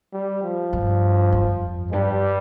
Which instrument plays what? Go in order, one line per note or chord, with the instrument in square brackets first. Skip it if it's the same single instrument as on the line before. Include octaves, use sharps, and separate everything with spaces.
[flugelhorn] G3
F3
[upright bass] G2
F2
[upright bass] G2 [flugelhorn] G3